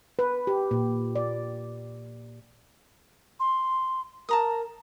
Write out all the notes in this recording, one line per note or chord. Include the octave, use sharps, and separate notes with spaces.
B4
G4
A#2
D5
C6
A#4 A5 A#5 D#6